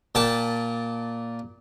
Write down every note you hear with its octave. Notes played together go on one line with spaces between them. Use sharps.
A#2 G5 A5 D6